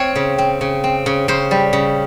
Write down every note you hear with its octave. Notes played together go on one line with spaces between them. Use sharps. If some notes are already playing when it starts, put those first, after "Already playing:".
Already playing: C4 C#5 F5
C#3
C4
C#3
C4
C#3
C#3 C5
G3
C#3